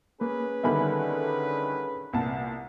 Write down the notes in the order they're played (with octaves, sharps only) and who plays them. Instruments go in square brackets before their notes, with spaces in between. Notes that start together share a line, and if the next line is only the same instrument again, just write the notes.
[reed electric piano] A#3 [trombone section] C#4 G#4 B4
[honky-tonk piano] D3 D#3 G3 [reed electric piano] E5 G#5 B5
[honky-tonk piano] C2 A#2 A5